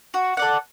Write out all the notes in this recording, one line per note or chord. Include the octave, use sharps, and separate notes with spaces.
F#4
A4 D5 F#5